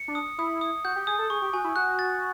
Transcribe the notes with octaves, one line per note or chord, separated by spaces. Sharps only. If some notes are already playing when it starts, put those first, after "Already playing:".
Already playing: C#7
D4
D#6
E4 D#6
D#6
F#4 G6
G4
G#4 D#6
A4
G#4 C#6
G4
F#4 G#5
E4
F#4 F#6
A6